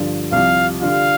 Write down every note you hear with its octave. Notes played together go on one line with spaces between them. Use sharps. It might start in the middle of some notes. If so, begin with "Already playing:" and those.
Already playing: G2 D3 F3
C2 C3 F3 F5
D3 G3 D4 F4 F5